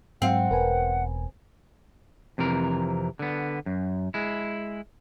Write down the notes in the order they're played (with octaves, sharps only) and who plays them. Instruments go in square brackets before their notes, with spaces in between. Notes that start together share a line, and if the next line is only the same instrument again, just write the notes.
[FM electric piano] G#2 F#3 F5 [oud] C4 [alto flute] F#5
[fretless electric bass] E1 [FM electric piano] A#4 B4 G#5
[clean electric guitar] F2 C3 E3 A#4
D3 B3
F#2
G#3 E4